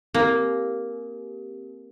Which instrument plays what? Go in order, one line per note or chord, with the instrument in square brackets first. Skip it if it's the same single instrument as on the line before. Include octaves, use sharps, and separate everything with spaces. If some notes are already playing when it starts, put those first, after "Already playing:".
[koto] A#3 [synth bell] C4 G4